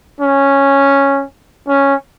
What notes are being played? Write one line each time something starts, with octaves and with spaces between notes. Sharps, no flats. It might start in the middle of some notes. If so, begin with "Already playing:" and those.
C#4
C#4